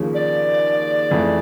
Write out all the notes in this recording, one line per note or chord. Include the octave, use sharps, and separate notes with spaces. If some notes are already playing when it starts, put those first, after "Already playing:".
Already playing: D#2 C#3 F3
D5
F2 C#3 E3 A3 C4